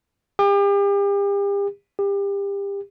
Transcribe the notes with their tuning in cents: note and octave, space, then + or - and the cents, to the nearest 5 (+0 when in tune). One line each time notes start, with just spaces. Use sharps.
G4 +40
G4 +30